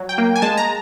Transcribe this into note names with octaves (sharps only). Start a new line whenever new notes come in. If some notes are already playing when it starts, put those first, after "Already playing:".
Already playing: F#3
G5
A#3
G#5
G#3 A5
A#5